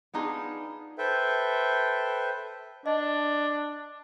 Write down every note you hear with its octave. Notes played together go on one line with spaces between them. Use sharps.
B3 D4 D#4 F4 G#4
A4 B4 C5 E5 G5
D4 D#5